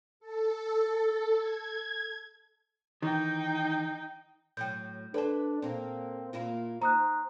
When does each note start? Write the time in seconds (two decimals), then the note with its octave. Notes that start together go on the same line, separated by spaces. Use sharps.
0.20 A4
1.39 G#6
3.02 D#3 E3 D#4 G5
4.57 A2 F#3 G5 G6
5.14 D4 A4 B4 C5 D5 A5
5.62 A#2 A#3 C4
6.33 A#2 A#3 E4 F4
6.82 D#4 C5 A#5 D#6 F#6